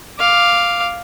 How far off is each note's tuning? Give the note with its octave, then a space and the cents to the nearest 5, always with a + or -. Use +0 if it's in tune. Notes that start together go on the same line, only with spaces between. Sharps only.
F5 +0 D6 +0